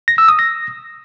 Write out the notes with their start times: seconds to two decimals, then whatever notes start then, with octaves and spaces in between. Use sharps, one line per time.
0.08 A#6
0.18 E6
0.28 D#6
0.39 A#6